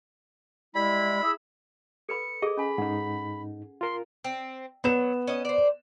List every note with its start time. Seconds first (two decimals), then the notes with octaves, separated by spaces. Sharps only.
0.75 G3 G#3 E4 B5
1.22 E4 G#4 E6
2.09 A4 B4 B5 C#7
2.42 G#4 A4 D#5
2.57 C#4 G#5 B5
2.78 G#2 D#4 F#5
3.81 F4 A#4 C6
4.24 C4
4.84 F#3 B3 E7
5.28 C#4 D#5
5.45 C5 D5